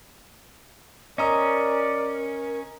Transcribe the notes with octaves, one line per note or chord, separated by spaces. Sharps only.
C#4 A#4 D5 D#5 A#5 D#6